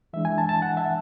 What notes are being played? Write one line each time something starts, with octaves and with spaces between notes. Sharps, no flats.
E3 G#3 D4 E5
G#5
A5
A5
F#5
E5